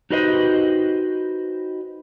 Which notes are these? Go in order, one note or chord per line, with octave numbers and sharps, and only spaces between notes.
D#4 F#4 G4 B4 C5 D#5